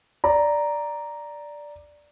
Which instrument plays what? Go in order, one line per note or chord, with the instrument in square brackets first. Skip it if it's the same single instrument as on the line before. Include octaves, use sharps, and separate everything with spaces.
[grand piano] D5 A#5